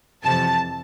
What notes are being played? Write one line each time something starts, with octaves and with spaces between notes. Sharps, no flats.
F2 C3 E3 A5